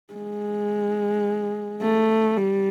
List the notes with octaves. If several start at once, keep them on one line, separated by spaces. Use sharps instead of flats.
G#3
A3
G3